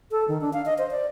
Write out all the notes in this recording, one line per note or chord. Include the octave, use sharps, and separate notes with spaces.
A4
D#3
D4
F5
D#5
C5
D5